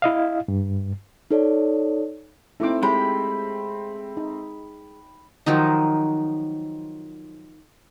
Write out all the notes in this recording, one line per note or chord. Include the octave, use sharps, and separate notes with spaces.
E4 D#5 F5
G2
D#4 A4 C#5 D5
A3 C4 D#4 E4 D6
G#3 G4 G5 B5 C6
D#4
D#3 F3 F#3 D#4